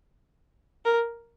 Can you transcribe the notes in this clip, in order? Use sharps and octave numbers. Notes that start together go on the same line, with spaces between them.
A#4